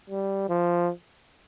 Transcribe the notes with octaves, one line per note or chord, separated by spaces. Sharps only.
G3
F3